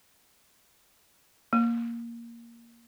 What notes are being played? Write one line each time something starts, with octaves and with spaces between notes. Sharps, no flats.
A#3